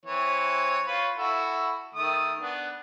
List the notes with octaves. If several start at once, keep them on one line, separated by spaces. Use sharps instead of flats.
E3 C4 C#5
F4 B4 C#5
E4 F#4 A4
D#3 A3 D#6
B3 D4